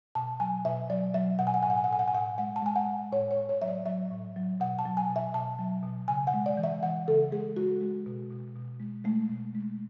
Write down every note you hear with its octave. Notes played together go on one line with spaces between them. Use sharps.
B2 A5
F#3 G#5
B2 E5
F#3 D5
F#3 E5
B2 F#5
G#5
F#5
A2 G#5
F#5
G#5
F#5
A2 G#5
F#5
G#5
A2 F#5
G#3 F#5
A5
G#3 G#5
F#5
G#3
A2 C#5
C#5
A2
C#5
F#3 E5
D5
F#3 E5
A2
F#3
B2 F#5
A5
F#3
G#5
B2
E5
B2 A5
F#3
B2
C#3 G#5
F#5
G#3
D5
E3
E5
E3 F#5
C#3 A4
G#3 G#4
G#3 F#4
G#3
B2
B2
B2
G#3
G#3 A3
B2
G#3